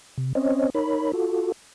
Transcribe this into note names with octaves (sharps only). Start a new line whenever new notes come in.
C3
C4 C#4 C5 C#5 D#5
D#4 A#4 C#5 B5
F4 F#4 A4